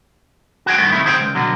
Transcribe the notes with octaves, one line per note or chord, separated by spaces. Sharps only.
F#4 G#4 G5
E2 G2 D#3 A3 B3
C3 D#3 A3 E4
D#3 G#4 C5 E5 G5
C#2
B2 D3 F#3